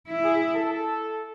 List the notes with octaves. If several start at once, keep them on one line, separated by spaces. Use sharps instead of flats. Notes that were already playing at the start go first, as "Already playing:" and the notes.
E4
G#4
A4